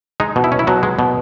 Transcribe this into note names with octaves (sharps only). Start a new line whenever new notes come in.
G#3 D#4
B2
E4
C#4
E4
B2 F#3 F#4
G#3
B2